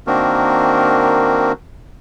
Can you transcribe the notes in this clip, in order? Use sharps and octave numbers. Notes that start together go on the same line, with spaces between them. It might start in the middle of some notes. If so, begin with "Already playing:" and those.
D#3 A#3 C4 D4 F#4 A#4